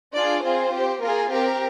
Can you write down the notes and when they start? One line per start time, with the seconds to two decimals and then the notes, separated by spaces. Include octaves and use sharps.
0.14 D4 F4 G#4 D5
0.43 C4 F4 G#4 C5
0.72 C4 G4
1.01 A#3 F4 G#4 A#4
1.30 C4 G4 A#4